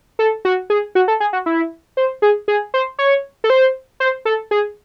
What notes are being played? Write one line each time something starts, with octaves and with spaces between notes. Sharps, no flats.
A4
F#4
G#4
F#4
A4
G#4
F#4
E4
C5
G#4
G#4
C5
C#5
A4
C5
C5
A4
G#4